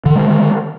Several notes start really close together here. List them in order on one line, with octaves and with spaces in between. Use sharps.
D3 D#3 G#3